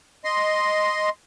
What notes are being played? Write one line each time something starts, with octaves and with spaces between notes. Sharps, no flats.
D#5 C6